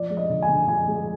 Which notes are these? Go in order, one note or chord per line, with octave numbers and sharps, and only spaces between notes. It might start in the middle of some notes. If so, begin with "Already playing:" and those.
Already playing: F3 D5
G#3
D#5
D3
G#5
D3
F3 G#5
G#3